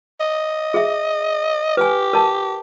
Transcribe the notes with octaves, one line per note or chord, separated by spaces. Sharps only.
D#5
G#4 E5
G4 B4 G#5
A#4 A5